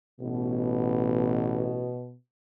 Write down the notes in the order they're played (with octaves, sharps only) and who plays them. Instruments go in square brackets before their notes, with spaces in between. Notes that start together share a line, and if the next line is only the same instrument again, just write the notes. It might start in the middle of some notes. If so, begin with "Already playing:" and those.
[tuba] A1 [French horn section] B2